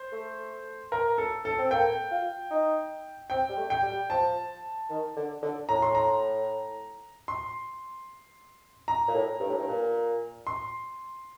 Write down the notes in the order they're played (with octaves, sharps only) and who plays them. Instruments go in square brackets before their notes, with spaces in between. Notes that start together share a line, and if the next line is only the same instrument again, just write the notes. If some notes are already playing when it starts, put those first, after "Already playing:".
Already playing: [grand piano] C5
[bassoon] A3
[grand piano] A#4
A4
A4
[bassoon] C4
[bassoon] A#3 [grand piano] G5
[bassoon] F4
D#4
[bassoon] C4 [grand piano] G5
[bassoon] G3
A3
[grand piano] G5
[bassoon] G3
[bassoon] F3 [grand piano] A5
[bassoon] D#3
D3
D3
[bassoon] A2 [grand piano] A#5
[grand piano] C6
A#5
C6
A#5
[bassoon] A#2
A2
G2
A2
G2
A#2
[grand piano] C6